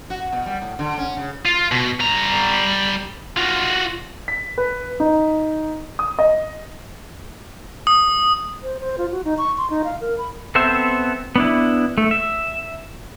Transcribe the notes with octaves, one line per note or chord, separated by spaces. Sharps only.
F#4
B2
G3
A2
D3
C#4
C#3
F4
B2
G3 A#5
F4 F#4
B6
B4
D#4
D#6
D#5
D#6
C5
C5
F4
F#4
D#4
C#6
C6
D#4
F5
A#4
B5
B3 C4 A4 C5 E5
B3 D4 E4
A3
E5